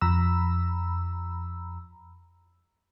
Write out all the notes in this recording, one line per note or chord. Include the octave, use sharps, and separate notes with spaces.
F2 A#5 B5 E6